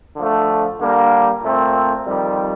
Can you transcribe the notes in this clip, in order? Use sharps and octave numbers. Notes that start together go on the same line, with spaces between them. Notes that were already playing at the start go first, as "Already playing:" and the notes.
D3 F3 A3
D3 G3 A#3
A#2 A3 C4
F2 D#3 G3